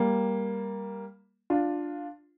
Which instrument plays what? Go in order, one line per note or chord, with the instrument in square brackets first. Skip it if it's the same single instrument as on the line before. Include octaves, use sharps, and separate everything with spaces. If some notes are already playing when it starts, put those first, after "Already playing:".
Already playing: [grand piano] G3 A#3
D4 F4